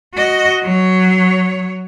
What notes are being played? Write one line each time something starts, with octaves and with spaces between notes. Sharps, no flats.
F#4 D#5
F#3 C#5